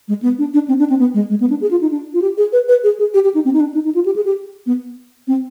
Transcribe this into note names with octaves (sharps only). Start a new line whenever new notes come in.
G#3
B3
D4
D4
C4
D4
C4
B3
G#3
G#3
B3
D4
G#4
F4
D#4
D4
F4
G4
G#4
B4
B4
G#4
G#4
G4
G4
D#4
C4
D#4
D4
D#4
D#4
F4
G4
G#4
G4
B3
C4